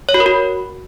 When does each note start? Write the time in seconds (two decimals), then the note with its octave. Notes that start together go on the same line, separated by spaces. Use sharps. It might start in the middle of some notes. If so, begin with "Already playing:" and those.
0.09 C#5
0.14 F#4
0.20 A#4
0.26 F#4